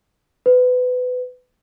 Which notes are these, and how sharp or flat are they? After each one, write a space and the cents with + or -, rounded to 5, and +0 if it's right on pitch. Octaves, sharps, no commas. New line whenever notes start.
B4 +25